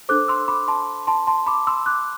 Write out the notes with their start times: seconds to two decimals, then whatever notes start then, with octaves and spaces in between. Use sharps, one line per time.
0.09 D4 A4 C5 D6 F#6
0.28 C6 E6
0.48 B5 D6
0.68 A5 C6
1.07 A5 C6
1.27 A5 C6
1.46 B5 D6
1.67 C6 E6
1.86 D6 F#6